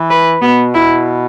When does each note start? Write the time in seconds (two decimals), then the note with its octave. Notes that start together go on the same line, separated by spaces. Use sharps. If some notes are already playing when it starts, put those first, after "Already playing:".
Already playing: E3
0.10 B4
0.42 B2 B3
0.75 E4